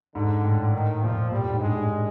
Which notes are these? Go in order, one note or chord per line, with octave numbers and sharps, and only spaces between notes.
G#2 D3
A2
D#3
A#2 F3
A#2 G3
A2
G#2
G2 G#3
G2